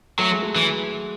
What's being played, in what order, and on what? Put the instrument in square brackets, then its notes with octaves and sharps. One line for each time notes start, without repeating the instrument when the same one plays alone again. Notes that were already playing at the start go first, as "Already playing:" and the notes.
[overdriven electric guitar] F#3 [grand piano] A3
[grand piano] G#3
F#3 A3
[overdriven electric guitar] E3